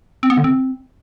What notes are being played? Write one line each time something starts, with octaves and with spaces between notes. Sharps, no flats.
C4
B3
D3
C4